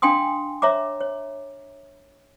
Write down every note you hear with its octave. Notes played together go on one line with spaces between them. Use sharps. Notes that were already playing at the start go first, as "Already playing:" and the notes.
D4 F5 G5 G#5 C6 D#6
C#5 E5 A#5 D6
C#5